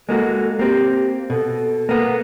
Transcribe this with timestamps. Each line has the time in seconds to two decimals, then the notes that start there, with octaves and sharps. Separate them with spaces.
0.09 G#3 A#3 F#4 A4
0.59 A#3 C4 G4
1.30 B2 A4
1.89 A#3 B3